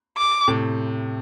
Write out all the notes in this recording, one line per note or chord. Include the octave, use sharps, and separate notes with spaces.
D6
A2 C3